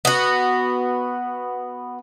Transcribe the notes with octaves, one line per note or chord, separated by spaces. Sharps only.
B3 F#4